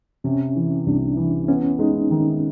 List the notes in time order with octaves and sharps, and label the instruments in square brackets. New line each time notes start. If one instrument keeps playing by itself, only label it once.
[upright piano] C3 [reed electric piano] C#4
[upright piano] E3
[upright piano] C2 [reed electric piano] D4
[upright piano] E3
[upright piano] B3 [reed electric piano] C#4
[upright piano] G#3 [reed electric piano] D#4
[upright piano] D#3